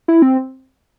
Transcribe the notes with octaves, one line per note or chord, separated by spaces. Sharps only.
E4
C4